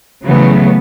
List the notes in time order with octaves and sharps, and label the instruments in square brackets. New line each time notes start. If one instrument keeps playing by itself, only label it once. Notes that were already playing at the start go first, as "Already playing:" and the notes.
[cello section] C#3 E3 F#3 A3 B3